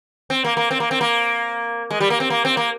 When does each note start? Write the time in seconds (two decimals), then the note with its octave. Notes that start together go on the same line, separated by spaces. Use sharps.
0.30 C4
0.45 A#3
0.57 A#3
0.71 C4
0.80 A#3
0.91 C4
1.01 A#3
1.91 G#3
2.00 G3
2.10 A#3
2.20 C4
2.30 A#3
2.45 C4
2.57 A#3